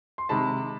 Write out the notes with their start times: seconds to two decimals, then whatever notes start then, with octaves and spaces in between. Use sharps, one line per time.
0.18 C6
0.29 C3 D#3 G#3 A5 B5